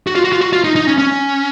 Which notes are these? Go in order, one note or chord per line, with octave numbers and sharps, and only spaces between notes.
F#4
F4
F#4
F4
F#4
F4
D#4
D#4
C#4
C#4